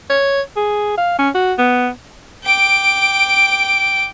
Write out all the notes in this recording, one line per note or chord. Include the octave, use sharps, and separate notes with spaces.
C#5
G#4
F5
C#4
F#4
B3
G5 D6